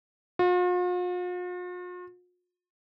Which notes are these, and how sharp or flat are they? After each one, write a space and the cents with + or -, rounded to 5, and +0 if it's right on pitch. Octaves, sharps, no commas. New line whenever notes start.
F4 +45